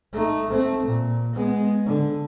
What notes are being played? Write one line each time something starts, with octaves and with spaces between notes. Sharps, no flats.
A3 D#4
A3 C4
A#2
G#3 B3
D3